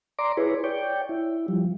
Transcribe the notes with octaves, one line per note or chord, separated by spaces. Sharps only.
D5 A#5 C6 D6
E4 G#4 B4 C#5
C#5 D5 G5
E4
F3 G3